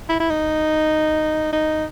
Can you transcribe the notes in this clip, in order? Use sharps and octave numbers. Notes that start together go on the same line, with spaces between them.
E4
E4
D#4
D#4